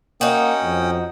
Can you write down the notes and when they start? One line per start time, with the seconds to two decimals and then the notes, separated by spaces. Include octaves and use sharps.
0.21 A#3 C#4 D#4 F#4 G5 D#6
0.63 F2